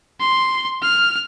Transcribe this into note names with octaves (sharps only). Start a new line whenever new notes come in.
C6
F6